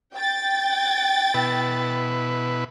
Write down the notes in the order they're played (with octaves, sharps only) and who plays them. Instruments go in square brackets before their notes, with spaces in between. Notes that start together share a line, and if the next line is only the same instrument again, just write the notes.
[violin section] G5 A6
[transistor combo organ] B2 E4 B4